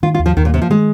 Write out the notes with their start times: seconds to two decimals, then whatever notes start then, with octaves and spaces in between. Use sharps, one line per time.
0.03 D#3 F4
0.15 F4
0.19 D#2
0.26 F3
0.37 D#2 D#3
0.45 A#2
0.53 C3 A#3
0.62 F3
0.70 D#3 G#3